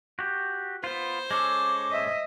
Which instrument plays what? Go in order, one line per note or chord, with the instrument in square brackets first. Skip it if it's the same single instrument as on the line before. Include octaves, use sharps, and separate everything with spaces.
[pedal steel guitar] F#4 G4
[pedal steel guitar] B3 F4 [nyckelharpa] C5
[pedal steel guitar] G#3 C#4 A4 [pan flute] D6
[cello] D#5 E5